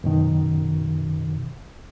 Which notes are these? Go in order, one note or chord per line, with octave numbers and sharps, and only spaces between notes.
F#2 B2 D#3